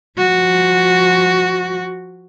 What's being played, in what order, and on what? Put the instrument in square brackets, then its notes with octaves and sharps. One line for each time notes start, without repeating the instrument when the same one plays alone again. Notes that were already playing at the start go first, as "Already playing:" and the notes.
[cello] F3 F#4